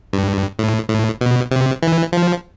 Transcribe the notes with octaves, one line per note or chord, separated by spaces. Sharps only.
G2
A2
A2
B2
C3
E3
F3